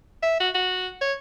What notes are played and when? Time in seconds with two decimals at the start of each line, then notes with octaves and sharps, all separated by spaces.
0.23 E5
0.40 F#4
0.54 F#4
1.01 C#5